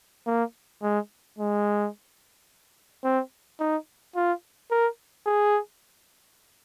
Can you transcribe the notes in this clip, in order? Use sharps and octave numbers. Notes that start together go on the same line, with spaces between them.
A#3
G#3
G#3
C4
D#4
F4
A#4
G#4